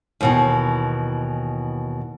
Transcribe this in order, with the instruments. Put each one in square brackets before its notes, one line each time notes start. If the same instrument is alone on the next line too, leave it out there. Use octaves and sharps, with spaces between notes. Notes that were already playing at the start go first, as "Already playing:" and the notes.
[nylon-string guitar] D#2 B2 E3